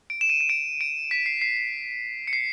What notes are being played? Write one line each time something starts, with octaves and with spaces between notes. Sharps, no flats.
D7
E7
D#7
D#7
D7
D7
B6
C7
C7
C7
C#7
C7